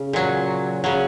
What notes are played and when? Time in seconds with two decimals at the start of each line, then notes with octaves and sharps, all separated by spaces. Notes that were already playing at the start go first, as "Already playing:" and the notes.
Already playing: C#3
0.13 A#2 F#3
0.84 C#3 F#3